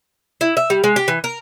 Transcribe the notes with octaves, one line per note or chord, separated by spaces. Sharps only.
E4
E5
G3
G#3
G4
E3
A#4